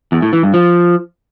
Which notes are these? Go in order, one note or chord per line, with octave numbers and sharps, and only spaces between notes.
E2
A2
E3
G2
F3